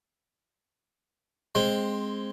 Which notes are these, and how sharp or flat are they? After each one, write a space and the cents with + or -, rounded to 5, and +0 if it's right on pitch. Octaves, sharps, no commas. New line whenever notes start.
G#3 +0 C4 +5